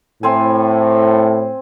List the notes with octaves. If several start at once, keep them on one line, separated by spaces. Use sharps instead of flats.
A2 C4 C5 G#5